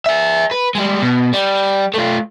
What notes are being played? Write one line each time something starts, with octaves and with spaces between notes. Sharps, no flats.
G#4 E5
B4
G3 G#3
B2
G3
A3 F4